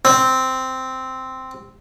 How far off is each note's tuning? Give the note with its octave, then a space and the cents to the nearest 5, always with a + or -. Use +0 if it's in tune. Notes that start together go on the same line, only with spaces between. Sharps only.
C4 -5